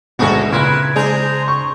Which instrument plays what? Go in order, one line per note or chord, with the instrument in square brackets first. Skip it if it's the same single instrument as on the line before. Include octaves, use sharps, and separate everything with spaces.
[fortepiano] D2 G#2 B2 [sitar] F#4 A4
[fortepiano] A#2 [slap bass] C#3 [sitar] E4 [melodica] B4
[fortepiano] G#3 [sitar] D4 G#4 [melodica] C5 A#5
[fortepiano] C#6